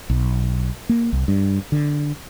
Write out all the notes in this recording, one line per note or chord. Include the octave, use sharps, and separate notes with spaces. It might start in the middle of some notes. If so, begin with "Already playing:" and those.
B1
A#3
C2
G2
D3